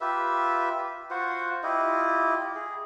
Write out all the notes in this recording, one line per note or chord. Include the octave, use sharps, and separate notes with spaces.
F4 G4 B4 E5
F4 F#4 C5 F#5
E4 F4 G4 D#5
G#4